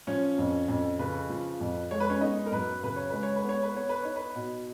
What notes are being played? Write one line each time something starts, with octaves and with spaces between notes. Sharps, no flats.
F3 C#4 C#5
F2
F2
C#3 B4
F3
F2
G#3 C#5
B4
C#4 C#5
B3 D#4 D#5
A#4
F#2 B4
C#3 B4
C#5
G#3 B4
C#5
B4
B3 C#5
B4
B3 C#5
B4
D#4 C#5
B4
B2